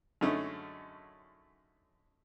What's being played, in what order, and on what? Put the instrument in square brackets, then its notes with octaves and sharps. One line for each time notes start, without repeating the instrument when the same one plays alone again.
[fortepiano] F#2 D3 G#3 A3 C#4 D#4